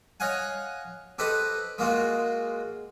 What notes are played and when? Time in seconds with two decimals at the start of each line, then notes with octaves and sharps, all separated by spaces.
0.20 C#5 D#5 F5 F#5 G#5
1.18 G4 A4 B4 C5 D#5
1.78 G#3 A#3 F4 F#4